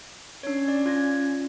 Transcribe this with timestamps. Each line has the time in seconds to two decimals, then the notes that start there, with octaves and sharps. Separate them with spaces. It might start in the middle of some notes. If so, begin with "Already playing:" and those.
0.43 C#4 D4 C#5
0.68 D5
0.86 F4 G#6 A#6